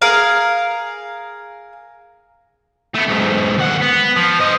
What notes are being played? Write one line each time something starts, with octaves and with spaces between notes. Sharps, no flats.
G#4 A#4 F5
A3 B3
B1 G#2
D#2 F#5
B3
F3
C5 D#5